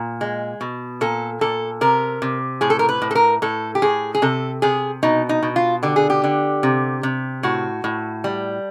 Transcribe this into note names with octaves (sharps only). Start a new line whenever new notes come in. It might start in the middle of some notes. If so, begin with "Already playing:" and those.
Already playing: A#2
G#3
B2
A#2 A4
A#2 A4
C3 A#4
C3
A2 G#4
A4
A#4
B4
A2
A4
A#4
A2 A4
G4
A2 G#4
G#4
C3 A4
C3 G#4
B2 D#4
D#4
B2
F4
D3 G4
G#4
G4
D3
C3
C3
A2 F#4
A2
G3